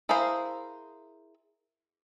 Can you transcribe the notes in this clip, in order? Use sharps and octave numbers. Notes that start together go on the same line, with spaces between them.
E4 G#4 A#4 C5 F5